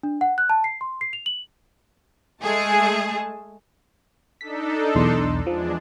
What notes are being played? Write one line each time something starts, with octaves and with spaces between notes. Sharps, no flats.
D4
F#5
F#6
A5
C7
C6
C7
F7
F#7
G#3 A3 G#4 A5
D4 D#4 A4 B6
B1 E2 C6
E2 F3 G#3 D4